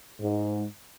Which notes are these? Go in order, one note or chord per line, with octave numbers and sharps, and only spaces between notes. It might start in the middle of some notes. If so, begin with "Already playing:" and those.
G#2